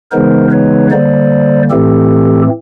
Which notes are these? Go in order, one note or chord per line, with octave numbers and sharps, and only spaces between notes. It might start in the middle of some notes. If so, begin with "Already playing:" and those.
C#3 E3 G#3 B3 D#4 A#4 C5
B4 C#5
D3 G3 A#3 C5 D5
A2 E3 A3 C4 G4 A4